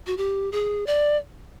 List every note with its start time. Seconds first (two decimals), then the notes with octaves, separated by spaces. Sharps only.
0.07 F#4
0.17 G4
0.52 G#4
0.86 D5